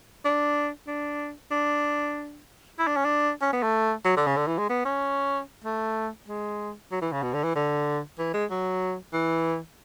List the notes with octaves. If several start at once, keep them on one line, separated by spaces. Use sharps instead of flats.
D4
D4
D4
E4
D4
C#4
D4
C#4
B3
A3
F#3
D3
C#3
D3
E3
G#3
B3
C#4
A3
G#3
F#3
E3
C#3
B2
D3
E3
D3
E3
G#3
F#3
E3